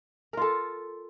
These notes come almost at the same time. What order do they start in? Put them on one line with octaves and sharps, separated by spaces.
A#4 F4 A4